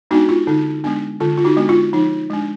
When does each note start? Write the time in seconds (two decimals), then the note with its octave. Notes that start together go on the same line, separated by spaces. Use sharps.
0.11 G#3 B3 D4 D#4 F#4
0.29 F4
0.47 D3 D#4
0.84 G#3 B3 D4
1.20 D3 F4
1.37 F4
1.44 D#4 F#4
1.57 G#3 B3 D4
1.69 F4
1.93 F3 D#4
2.30 G#3 D4